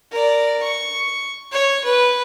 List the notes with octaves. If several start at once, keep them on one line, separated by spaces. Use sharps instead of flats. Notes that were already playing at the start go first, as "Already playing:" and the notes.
A#4 D5
C#6
C#5
B4